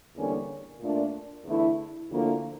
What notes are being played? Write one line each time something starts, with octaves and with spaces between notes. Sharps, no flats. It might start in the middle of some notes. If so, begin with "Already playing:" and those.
E2 D3 G3 A#3 C#4
A#2 A3 D4
E2 D3 A3 E4
D2 D3 F3 A#3 E4